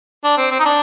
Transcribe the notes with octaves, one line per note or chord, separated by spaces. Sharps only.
D4
C4
C4
D#4
D4